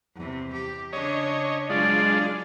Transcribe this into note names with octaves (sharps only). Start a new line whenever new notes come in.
E2 C3
G4
C#3 D4 C#5 D#5
F#3 G#3 D4 F4 G#4 D5